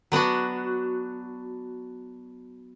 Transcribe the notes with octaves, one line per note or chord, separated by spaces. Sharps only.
F#3 B3 D4 F#4